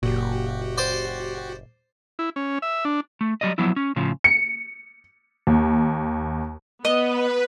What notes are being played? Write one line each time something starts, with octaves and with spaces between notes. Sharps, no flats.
F#1 A#2 F#4 G4
C5 D5 C6
E4
C#4
E5
D4
A3
F#3 G3 D5 D#5
F3 F#3 B3 E4
C#4
A2 C#3 F3
C#7
D#2
B3 B4 D#5